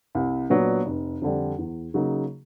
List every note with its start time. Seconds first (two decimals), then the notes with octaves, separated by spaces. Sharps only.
0.15 C2
0.50 A#2 F#3 B3 D4
0.86 F1
1.22 F2 D3 G3
1.58 E2
1.94 C#3 F#3 A#3 D#4